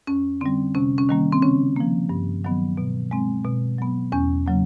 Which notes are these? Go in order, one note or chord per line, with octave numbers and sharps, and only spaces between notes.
F2 C#4
D3 G3 C4
C3 C#4
C#4
D#3 G3 A#3
C4
C#3 C#4
F3 A#3
G2
D#3 F#3 B3
B2
G#3 C4
B2
F#3 B3
E2 C#4
C#3 F#3 A#3